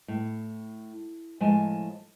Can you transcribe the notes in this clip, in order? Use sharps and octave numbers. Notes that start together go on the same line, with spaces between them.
A2
A2 F3 G#3 G#5 A5